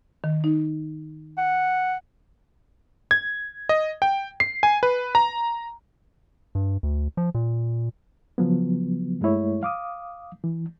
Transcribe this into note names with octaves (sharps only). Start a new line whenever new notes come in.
D#3
D#4
F#5
G#6
D#5
G5
C7
G#5
B4
A#5
G2
D2
F3
A#2
C#3 F3 F#3 B3
G2 G#3 A3 E4 C#5
F5 D6 D#6
E3